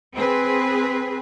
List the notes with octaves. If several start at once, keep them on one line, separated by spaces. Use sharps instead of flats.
C4 G#4 B4